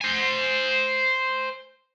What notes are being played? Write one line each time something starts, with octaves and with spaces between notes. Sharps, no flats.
C5 G#5